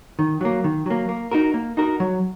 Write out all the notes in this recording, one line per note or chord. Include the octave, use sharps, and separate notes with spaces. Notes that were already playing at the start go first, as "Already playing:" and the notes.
D#3
F#3 A#3
D#3
F#3 A#3
A#3
D#4 F#4 A#4
A#3
D#4 F#4 A#4
F#3